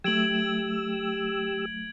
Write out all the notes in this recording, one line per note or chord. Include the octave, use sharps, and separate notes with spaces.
F#3 A3 G4 E6 G#6 D7 F#7